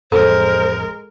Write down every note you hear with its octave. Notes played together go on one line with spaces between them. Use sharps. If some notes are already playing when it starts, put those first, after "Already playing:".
A1 F2 G#3 A4 A#4 C5